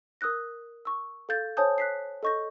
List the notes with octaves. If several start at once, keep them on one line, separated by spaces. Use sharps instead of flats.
A#4 D#6 E6 F#6 A#6
C#6 E6
A4 F5 G6 A6
C5 C#5 G#5 A5 D#6 G6
F#6 B6 C7
A4 D#5 C#6 G6 A#6